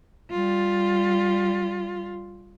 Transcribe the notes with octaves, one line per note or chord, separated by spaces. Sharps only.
G3 F4